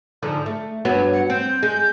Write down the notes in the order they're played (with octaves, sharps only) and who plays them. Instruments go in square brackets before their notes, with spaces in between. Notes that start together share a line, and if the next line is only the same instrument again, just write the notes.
[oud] G#2 D3 F3
A3
G2 F#3 B3
[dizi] F#5
[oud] C4 [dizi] G6
[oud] G#3 [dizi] G6